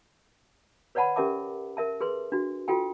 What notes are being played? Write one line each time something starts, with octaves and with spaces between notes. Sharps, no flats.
B4 C#5 D5 F#5 A5 B5
C#4 G4 A#4 E5 A5 D6
A#4 E5 A5
G#4 B4 C6
D4 F#4
F4 F#4 A4 G5 G#5